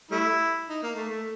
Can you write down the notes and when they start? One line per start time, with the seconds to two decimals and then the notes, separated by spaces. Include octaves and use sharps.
0.11 G3 A3 E4
0.69 D#4
0.83 A#3
0.95 A3
1.08 A3